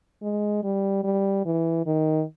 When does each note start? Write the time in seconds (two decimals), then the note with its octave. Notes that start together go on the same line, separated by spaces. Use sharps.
0.22 G#3
0.63 G3
1.04 G3
1.45 E3
1.86 D#3